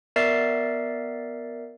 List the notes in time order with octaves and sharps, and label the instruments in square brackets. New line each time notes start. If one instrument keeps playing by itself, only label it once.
[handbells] B3 A#4 D5 E5 A6 C7